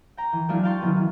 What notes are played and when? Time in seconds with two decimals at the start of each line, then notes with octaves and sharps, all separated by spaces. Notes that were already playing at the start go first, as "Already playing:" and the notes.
0.17 G5 A#5
0.33 E3
0.48 F#3 G#3 A3 D4 E4 F4
0.63 F5 G5 A5 C6 C#6
0.80 D#3 E3 F#3 B3 C#4 G#4
0.96 E3